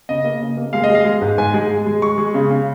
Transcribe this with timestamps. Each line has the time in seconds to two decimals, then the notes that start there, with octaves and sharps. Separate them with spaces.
0.09 C#3 D#5
0.25 A#3
0.42 C#3
0.57 A#3
0.73 G#3 F5
0.84 D#5
0.90 G#3 F5
1.05 G#3
1.22 G#2
1.38 G#2 G#5
1.54 G#3
1.70 G#3
1.86 G#3
2.02 G#3 C#6
2.18 G#3
2.34 C#3
2.50 C#3